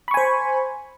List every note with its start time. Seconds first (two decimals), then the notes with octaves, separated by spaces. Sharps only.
0.08 B5
0.11 C#6
0.14 G#5
0.17 C5